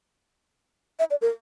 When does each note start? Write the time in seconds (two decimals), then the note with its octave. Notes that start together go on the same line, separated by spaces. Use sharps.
0.99 E5
1.11 D5
1.22 A#4